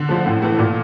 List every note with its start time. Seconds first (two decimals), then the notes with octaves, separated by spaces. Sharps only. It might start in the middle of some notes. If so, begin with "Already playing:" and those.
Already playing: D3
0.09 F3 A3
0.26 A2
0.42 E3 A3
0.59 A#2